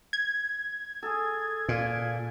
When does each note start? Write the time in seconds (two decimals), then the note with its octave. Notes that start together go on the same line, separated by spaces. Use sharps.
0.13 G#6
1.03 G#4 A4
1.69 A#2